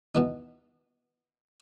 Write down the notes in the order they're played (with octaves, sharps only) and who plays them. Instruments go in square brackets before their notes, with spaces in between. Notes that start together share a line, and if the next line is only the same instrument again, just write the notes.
[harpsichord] B2 E3 D#4